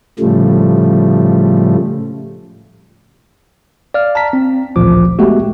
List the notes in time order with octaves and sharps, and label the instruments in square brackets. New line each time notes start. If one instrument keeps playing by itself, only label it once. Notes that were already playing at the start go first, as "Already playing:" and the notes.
[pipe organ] A2 C#3 F3 G3 A3
[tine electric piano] D5 F5 F6
A5 A#5 B6
C4
A1 D2 A#2 F3 D6
G#3 A3 B3 F#4 G4